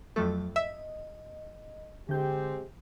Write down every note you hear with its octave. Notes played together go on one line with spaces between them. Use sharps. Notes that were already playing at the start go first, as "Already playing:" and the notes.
F2 F#3 A3 A4
D#5 E5
D3 G#3 C4 G4 G6